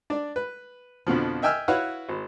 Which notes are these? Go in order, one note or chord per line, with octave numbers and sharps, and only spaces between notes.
D4 D5
B4
F2 B2 D3 F3
D#5 E5 G5 G#5 E6 F6
E4 F#4 B4 C#5 F5 F#5
G#1